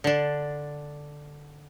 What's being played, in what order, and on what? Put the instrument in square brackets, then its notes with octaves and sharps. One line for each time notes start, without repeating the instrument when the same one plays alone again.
[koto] D3 D4